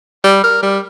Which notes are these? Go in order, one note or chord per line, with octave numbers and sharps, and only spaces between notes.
G3
A#4
G3